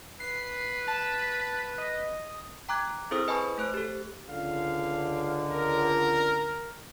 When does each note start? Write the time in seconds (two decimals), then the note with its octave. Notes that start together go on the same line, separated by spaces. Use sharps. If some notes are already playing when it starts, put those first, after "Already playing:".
0.20 B4 C7
0.88 A5
1.78 D#5
2.69 G5 A#5 D6 F#6 G#6
3.11 C4 E4 G#4 A4 C5 D#6
3.28 B4 D#5 G#5 A5 B5 C#6
3.58 A3 C5 F#6 D7
3.74 G4 A4
4.29 C#2 D3 F5
5.51 A#4